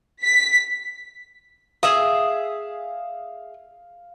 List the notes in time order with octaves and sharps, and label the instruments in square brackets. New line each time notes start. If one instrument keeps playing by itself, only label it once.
[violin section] B6
[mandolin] G#4 E5 D#6 [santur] F5